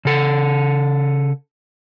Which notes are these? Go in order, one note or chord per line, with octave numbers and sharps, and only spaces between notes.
C#3 A4